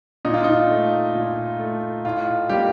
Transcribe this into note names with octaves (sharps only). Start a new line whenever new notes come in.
A#2 D#4
F4
D#4
A3
A#2
A3
A2 F4
G3 A#3 G4